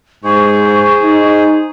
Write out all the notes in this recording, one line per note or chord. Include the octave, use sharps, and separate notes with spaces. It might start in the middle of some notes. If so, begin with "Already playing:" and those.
G#2 G#4 C5 C#6
D#4